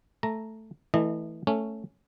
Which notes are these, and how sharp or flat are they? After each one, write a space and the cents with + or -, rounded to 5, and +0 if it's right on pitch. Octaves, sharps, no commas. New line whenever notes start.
A3 +0 A#5 +0
E3 -15 A3 +0 D#5 -30
A3 +5 C#4 +0